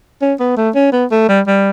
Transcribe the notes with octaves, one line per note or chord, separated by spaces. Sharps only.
C#4
B3
A3
C#4
B3
A3
G3
G3